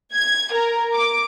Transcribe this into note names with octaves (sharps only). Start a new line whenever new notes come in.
G#6
A#4
D6